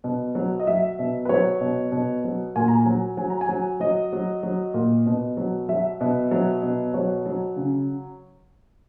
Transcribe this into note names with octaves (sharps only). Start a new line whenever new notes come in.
B2
F#3
D#5
F#3 E5
B2
B4
F#3 C#5
B2
B2
F#3
A#2 G#5
A#5
G#5
F#3
F#3 G#5
A#5
G#5
F#3
F#3 D#5
F#3
F#3
A#2
B2
F#3
F#3 E5
B2
F#3
B2
F#3 C#5
F#3
C#3